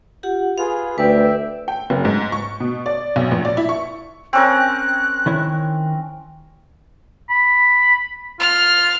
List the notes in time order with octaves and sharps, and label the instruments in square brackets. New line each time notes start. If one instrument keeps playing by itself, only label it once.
[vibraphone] F4 G4 F#5
[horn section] F4 G#4 B4 [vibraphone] F5
[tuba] D2 [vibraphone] B4 [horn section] D5 E5 G5
[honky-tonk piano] G5
F#1
G#2
C#6
B2
D5
B1
A#1
D5
E4
C#6
[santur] C4 C#4 A#4 [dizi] F#6
[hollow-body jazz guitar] D#3 E4 C#5
[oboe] B5
[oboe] F4 [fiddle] F6